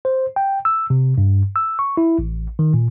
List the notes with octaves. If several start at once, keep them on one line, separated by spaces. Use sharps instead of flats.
C5
G5
E6
C3
G2
E6
C#6
E4
A1
D#3
A#2